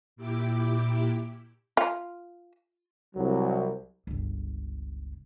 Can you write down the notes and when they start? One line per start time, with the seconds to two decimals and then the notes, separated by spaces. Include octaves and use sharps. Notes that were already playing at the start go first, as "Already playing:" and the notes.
0.16 A#2 E4 G4 D6
1.77 F4
3.15 C2 F#3
4.07 G1 C#2